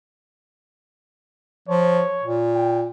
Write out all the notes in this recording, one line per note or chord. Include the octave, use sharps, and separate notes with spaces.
F3 C#5
A#2
G5